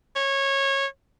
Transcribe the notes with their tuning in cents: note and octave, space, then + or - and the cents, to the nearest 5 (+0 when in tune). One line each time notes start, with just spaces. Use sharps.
C#5 -20